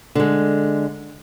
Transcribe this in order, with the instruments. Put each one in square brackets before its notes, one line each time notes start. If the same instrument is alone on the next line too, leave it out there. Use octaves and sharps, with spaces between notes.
[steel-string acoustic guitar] D3 G#3